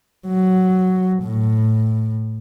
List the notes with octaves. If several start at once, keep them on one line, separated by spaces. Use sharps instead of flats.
F#3
A2